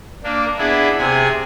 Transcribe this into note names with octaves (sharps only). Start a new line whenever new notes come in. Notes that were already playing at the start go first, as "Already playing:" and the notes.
A#3 D4
B3 D4 E4 G#4
C3 G#4 G#5